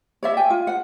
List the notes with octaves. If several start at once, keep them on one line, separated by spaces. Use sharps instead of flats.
C#5 D5 E5
G5 G#5
F4
F#5